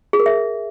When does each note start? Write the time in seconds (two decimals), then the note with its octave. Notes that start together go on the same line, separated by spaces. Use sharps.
0.13 G#4
0.20 A#4
0.26 E5